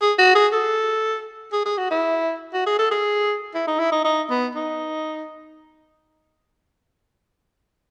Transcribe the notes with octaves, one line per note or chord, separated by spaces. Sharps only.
G#4
F#4
G#4
A4
G#4
G#4
F#4
E4
F#4
G#4
A4
G#4
E4
D#4
E4
D#4
D#4
B3
D#4